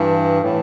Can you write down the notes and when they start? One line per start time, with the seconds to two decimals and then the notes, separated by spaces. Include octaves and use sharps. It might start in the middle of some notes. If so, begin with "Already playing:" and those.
Already playing: G2 E3
0.42 A2 E3